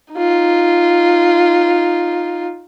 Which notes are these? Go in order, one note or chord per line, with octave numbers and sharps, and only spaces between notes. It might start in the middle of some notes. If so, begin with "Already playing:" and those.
D#4 F4